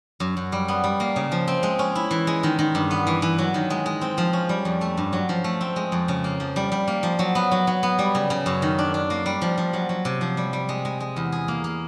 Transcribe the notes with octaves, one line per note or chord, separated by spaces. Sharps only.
F#2
F#2
G3
B3
G3
A#3
C#3
F3
C4
G#3
C#4
E4
E3
G#3
D#3
D#3
G2
B3
E3
E3
F#3
D#3
G#3
G#3
C4
F3
C#4
G3
F2
A3
G2
F#3
F3
A3
C4
G#3
F2
C#3
A#3
F3
G3
G3
A#3
F3
F#3
B3
F#3
F#3
B3
G3
C#3
C#3
F#2
D#3
D4
D4
A#3
G3
F3
F3
F#3
F#3
C3
F3
G3
G3
G#3
G#3
G#3
E2
G#4
A#3
A#3